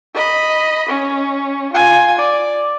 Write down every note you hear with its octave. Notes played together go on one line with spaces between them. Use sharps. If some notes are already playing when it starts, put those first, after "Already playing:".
D#5 B5
C#4
F4 G#5
D5